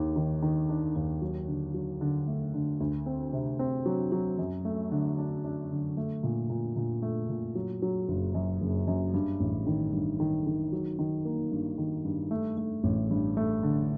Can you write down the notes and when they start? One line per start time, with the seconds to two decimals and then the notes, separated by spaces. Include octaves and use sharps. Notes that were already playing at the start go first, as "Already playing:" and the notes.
Already playing: D#2 D#3
0.16 D#3
0.42 D#3
0.69 D4
0.95 D#2
1.22 F#3
1.48 D3
1.74 F#3
2.01 D3
2.28 A3
2.54 D3
2.80 D2
3.06 C4
3.33 C3
3.59 C4
3.86 F#3
4.12 F#3
4.39 F#2
4.65 A3
4.91 D3
5.18 D4
5.44 D4
5.71 D3
5.97 A3
6.23 A#2
6.50 A#2
6.76 A#2
7.02 A3
7.29 A#2
7.55 F#3
7.82 F#3
8.08 F#1
8.35 F#2
8.61 F#1
8.87 F#2
9.14 G2
9.40 A1
9.67 D#3
9.93 G2
10.20 D#3
10.46 D#3
10.72 F#3
10.99 D#3
11.25 A#3
11.51 G2
11.78 D#3
12.05 G2
12.31 A3
12.57 A3
12.84 A1
13.11 G2
13.37 A3
13.63 D3